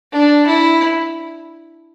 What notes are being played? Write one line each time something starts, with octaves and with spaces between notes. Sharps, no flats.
D4
E4